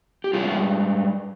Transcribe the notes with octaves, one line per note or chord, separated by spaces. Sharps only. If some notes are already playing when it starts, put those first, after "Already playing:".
G4
G#2 G3 F4 G#4